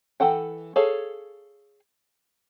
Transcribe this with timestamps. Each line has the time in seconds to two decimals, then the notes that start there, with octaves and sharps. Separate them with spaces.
0.20 E3 A4 F#5 G5
0.76 G#4 A4 C#5 F5